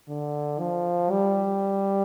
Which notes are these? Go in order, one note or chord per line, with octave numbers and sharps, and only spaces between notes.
D3
F3
G3